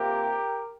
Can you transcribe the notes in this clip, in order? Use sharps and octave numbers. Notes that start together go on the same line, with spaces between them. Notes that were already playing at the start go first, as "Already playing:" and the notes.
Already playing: C3 F3 A#3 G4 A#4